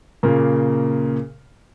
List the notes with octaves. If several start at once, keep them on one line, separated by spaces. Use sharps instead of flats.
A#2 C#3 A#3